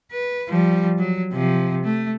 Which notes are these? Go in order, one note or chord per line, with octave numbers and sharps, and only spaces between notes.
B4
F3 G3
F#3
C3 F3
A3